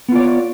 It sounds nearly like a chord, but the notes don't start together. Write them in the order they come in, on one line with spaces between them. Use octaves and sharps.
B3 F4 D5 C#5